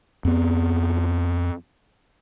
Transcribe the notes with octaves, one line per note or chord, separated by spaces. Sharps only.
F2 B3